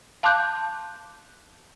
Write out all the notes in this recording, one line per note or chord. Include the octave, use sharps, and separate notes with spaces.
F5 A5 C6 D6 F#6 G6